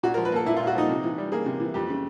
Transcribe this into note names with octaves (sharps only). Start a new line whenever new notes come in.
A#2 F#4
A#4
F3
B4
A#3 A4
A#2 E4
F4
A#2
F#4
F3 D#4
C3
E3
G3
A#3 G#4
C3
E3
F2 G4
C#3